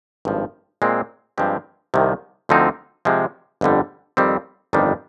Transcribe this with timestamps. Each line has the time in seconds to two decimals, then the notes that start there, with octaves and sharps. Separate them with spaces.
0.25 G#1 G2 F3
0.82 A#2 G#3 C4
1.38 G2 F3 G#3 C4 G4
1.94 C2 C3 D#3
2.49 D2 D3 F3 C4 D#4
3.05 C3 F3 G#3
3.61 G1 F2 D3 G3
4.17 F2 D#3 G3 C4
4.73 G1 F2 D#3 G3 D4